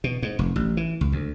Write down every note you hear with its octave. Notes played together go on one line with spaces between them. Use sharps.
B2
G#2
F1
A1
E3
C#2
D2